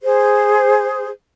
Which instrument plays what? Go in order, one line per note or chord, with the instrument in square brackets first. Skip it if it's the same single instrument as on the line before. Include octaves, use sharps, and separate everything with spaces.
[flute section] G#4 C5